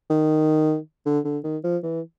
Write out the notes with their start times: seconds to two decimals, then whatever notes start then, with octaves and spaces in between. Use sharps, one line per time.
0.10 D#3
1.06 D3
1.25 D3
1.44 D#3
1.64 F3
1.83 E3